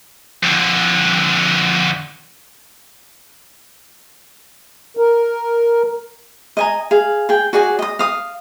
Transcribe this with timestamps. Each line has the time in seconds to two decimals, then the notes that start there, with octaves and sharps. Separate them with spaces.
0.43 F2 D3
4.97 A#4
6.57 D#5 G#5 A#5
6.91 G#4 F5
7.29 G#4 G5
7.53 F#4 G#4 D5 G#5
7.79 D#5 D#6
7.99 F5 D#6